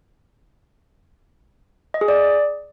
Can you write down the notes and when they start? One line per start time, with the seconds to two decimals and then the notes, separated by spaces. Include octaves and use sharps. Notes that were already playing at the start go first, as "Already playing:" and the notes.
1.94 D#5
2.01 G#4
2.08 D5